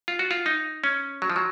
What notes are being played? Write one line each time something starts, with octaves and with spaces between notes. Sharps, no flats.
F4
F#4
F4
D#4
C#4
F#3
F3
F#3